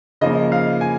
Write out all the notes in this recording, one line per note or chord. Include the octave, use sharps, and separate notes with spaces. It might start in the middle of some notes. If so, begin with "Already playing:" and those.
C#3 F3 A#3 D#5
F5
G#5